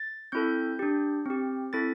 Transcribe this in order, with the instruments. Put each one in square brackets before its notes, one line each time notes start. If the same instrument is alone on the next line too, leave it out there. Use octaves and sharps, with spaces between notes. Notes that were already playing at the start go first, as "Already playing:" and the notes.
Already playing: [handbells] A6
C4 E4 A4 G6
D4 G4
C4 G4
C4 E4 A4 A6